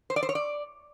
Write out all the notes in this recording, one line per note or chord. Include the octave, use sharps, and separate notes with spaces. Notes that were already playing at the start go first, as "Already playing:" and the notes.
C5
D5
C5
C#5
D5